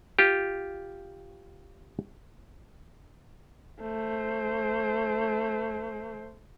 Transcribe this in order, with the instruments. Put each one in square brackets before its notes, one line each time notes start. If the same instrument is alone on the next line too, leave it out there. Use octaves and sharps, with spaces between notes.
[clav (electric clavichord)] F4 G4
[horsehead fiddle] A3 C5